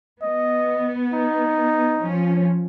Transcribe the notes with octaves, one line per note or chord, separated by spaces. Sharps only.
B3 D#5
D#4
F3 C#4